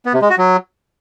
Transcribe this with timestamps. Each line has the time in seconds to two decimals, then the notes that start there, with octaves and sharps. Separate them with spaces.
0.05 B3
0.14 C3
0.22 G#3
0.30 F#4
0.38 F#3